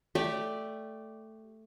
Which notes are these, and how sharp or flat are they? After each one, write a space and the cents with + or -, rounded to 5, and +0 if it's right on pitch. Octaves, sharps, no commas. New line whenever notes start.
A3 +0 G4 +0 D5 +0